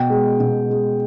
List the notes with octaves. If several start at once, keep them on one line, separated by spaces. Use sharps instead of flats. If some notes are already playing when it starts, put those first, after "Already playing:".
Already playing: B2 G5
G#3
B2
G#3